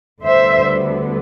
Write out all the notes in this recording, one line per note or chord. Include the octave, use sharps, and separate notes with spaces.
D2 D3 G3 B3 C5 E5